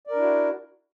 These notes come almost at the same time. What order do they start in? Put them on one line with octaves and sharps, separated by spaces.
D5 A#4 D4 E4 F#4